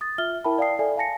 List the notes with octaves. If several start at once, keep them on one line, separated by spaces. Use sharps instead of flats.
D#6 A6
F4 E5 F6 G7
E4 A#4 E5 G5 A5 B5
D5 F5 G5 A5 D#6 C7
A4 D5 E5 G#5
F5 G#5 A5 A#6 C#7